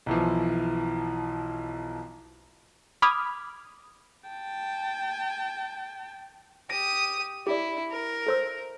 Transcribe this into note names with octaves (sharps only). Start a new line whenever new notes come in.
B1 E3 F3
B5 D6 D#6 F6 G#6
G5 A5
G4 D#6 A#6 D7
E4 G4 D5
A#4
A4 C5 E6